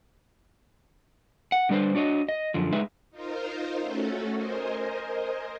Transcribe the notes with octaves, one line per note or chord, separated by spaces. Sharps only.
F#5
D3 G3 D4 B4 C5
D4 F#4 C#5 D#5
D#5
F#2 D3 F3
G#3 D#4 B4 E5
D#4 F4 A#4 C5
A3 C#4 F#4 A4
A#4 C5 D#5 G#5